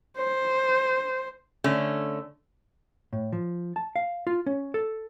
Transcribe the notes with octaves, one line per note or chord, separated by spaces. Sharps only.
C5
D3 A3 C#4
A2
F3
A5
F5
F4
C#4
A4